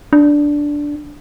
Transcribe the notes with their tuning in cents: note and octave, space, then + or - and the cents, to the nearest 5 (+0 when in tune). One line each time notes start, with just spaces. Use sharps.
D4 -5